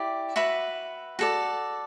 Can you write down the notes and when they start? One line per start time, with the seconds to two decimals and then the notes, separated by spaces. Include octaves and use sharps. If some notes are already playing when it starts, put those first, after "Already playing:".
Already playing: E4 G4 D5
0.36 F#4 B4 E5 B5
1.19 F#4 A4 D5